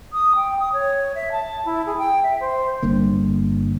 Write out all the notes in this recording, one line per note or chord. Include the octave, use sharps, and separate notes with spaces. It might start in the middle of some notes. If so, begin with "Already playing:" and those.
D#6
G5
D#6
C#5
E5
A5
E4
G#4
G5
E5
C5
G1 G2 D3 A#3